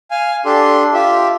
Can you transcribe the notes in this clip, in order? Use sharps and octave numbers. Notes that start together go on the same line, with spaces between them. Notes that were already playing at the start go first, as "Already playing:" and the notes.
F5 G#5
D4 G4 A4 C6
F4 G4 E5